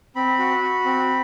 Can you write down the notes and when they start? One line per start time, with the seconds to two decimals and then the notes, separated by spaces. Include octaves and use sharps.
0.16 C4 B5
0.39 F#4
0.62 F#4
0.85 C4